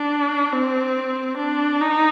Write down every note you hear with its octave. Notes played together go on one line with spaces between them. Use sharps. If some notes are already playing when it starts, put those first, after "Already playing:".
Already playing: D4
C4
D4
D#4